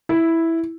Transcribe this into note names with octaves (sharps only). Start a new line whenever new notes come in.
E4